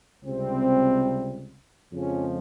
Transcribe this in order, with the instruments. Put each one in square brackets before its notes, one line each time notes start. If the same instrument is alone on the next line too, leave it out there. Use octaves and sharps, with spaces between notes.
[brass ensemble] C#2 C3 G3 C4
F2 C#3 F3 G#3 C#4